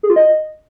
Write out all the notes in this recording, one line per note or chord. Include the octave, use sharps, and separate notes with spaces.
G#4
F4
D#5